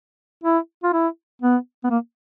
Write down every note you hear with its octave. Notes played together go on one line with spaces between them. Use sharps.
E4
F4
E4
B3
B3
A#3